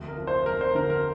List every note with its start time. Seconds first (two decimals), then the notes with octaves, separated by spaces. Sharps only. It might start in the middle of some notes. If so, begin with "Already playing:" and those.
Already playing: F1 D2
0.08 A#4
0.18 F3
0.27 C5
0.46 F1 A#4
0.61 C5
0.75 D3 A#4
0.90 A#4